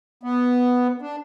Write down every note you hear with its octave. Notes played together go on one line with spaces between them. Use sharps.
B3
D4